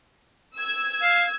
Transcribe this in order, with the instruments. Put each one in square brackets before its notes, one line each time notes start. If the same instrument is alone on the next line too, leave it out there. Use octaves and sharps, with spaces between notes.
[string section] E6 G#6
[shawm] F5